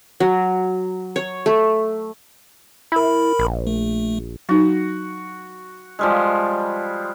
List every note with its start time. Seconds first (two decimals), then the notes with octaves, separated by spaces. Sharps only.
0.20 F#3
1.16 C#5
1.46 A3
2.92 E4 A#4 B5
3.39 A#1
3.67 A3
4.49 F#3 D#4 F#4
5.99 F3 G3 G#3